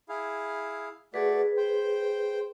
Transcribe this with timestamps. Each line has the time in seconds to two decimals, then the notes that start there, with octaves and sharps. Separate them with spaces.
0.09 E4 G#4 F5
1.14 A3 F#4 G#4 B4 D5
1.57 C5 G5